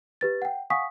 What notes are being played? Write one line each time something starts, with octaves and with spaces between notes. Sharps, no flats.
G4 B4 A6
F#5 G5
F5 F#5 G#5 C#6 D#6 B6